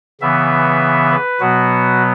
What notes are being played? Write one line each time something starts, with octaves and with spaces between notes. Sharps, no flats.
C#3 E3 B3 E5
B4
B2 F#3 B3 F#4